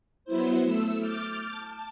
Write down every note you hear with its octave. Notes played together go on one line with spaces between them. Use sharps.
F#3 B3 E4 C5
A3 E6
D6 F6 G6 A6
A5